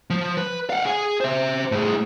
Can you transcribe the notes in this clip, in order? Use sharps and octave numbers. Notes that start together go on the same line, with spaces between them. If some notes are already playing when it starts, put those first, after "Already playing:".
F3
B4
F5 F#5
G#4 G#5
C5 E5
A2 G#4